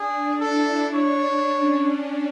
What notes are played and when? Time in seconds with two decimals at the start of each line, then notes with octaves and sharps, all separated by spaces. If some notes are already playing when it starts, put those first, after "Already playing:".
Already playing: D4 G#4
0.41 E4 A4
0.93 D4 C#5
1.48 C#4